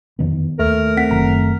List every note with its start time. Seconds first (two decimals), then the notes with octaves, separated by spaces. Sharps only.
0.19 F2 D#3 B3
0.59 D#2 A3 A#4
0.97 C4 F#5 B6
1.11 F#1 D#3 A#5